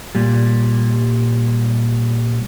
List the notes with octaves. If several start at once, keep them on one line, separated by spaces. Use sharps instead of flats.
A#2 G3